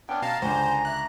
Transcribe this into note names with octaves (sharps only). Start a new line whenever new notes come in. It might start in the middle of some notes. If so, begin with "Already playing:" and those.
B3 C#4 D4 G5
B2 F5 A5 A#5
C#2 D3 C5 G#5
E5 F#6